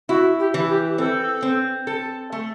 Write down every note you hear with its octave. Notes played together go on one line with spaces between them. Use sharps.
E4 F#4
G4
E3
G4
C4 A4
C4
A4
A3